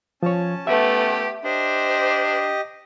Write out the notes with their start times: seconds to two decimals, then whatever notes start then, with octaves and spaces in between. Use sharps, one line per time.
0.23 F3 C#4 C#5 A5
0.67 A3 B3 G4 E5
1.44 D4 G4 C5 D#5